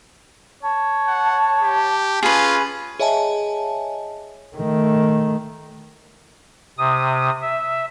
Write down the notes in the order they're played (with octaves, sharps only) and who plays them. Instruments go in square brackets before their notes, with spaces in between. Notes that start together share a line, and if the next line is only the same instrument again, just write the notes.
[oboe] C#5 [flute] A5
[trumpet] F#5
G4
[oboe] C#4 [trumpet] F4 [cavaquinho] G#4 B4
[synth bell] G#4 C#5 D#5 E5 G#5 A5
[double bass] D#3 A3
[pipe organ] C3 D#6
E5